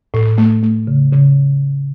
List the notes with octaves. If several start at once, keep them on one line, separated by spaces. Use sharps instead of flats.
A2
A3
A3
C#3
C#3